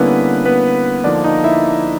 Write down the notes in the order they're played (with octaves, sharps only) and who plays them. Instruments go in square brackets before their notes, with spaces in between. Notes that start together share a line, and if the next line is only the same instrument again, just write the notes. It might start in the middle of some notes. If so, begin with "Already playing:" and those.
Already playing: [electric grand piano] D3 G3 A#3 B3 C#4 E4 B4
B3 B4
D3 F3 A#3 D4 D#4 D5
D#4 D#5
E4 E5